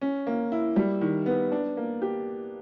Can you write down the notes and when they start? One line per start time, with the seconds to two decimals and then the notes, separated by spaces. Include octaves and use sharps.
0.01 C#4
0.27 A#3
0.52 E4
0.76 G3
1.01 D#3
1.26 B3
1.52 D4
1.77 A#3
2.02 G4